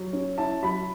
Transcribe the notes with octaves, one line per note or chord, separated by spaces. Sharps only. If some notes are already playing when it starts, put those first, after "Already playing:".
Already playing: F#3
C#4
E4 A5
F#3 B5